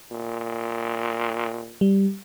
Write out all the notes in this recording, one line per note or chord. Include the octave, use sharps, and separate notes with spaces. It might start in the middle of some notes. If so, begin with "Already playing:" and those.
A#2
G3